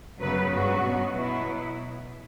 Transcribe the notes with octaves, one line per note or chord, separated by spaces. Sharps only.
F#2 C#3 F#3 B3 B4
G2 F#3 B3 F#4
B2 F#3 B3
B2 F#3 B3 E4